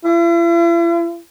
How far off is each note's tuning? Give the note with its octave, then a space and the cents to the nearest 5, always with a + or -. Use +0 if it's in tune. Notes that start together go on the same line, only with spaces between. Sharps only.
E4 +45